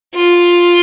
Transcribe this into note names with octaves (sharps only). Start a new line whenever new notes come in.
F4